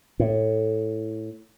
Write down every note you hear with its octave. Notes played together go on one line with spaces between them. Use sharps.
A2